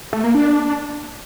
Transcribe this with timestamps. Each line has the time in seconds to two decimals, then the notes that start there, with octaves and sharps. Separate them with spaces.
0.13 A3
0.24 A#3
0.35 D4